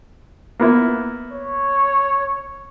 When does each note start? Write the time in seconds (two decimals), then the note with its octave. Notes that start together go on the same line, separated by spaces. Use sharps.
0.60 A#3 B3 E4
1.31 C#5